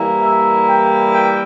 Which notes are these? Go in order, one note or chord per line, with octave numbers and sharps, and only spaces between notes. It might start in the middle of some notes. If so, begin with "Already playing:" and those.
Already playing: E3 G3 A#3 E4
E5
G5
G5